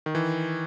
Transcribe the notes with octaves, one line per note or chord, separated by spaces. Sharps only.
D#3
E3